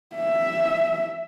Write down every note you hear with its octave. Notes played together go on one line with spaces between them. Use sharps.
E5